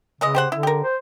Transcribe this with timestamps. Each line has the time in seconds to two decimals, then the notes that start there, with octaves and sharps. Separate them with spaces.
0.21 C#3 E3 G#3 D#5
0.35 G4 C5 F#5
0.52 D3 E4
0.63 G4 A#4
0.84 C5